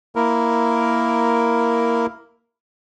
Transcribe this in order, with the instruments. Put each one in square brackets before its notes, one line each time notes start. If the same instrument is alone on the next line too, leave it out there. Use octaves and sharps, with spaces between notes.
[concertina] A#3 E4 A#4